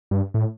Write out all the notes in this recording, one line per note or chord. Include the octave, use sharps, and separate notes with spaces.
G2
A2